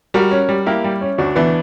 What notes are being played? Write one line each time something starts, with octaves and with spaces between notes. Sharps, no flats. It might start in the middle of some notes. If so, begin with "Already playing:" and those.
G3 F#4 A#4
C#4
G3
A#3 E4 G4
G3
C#4
D2 D4 F#4
E3 B3 D4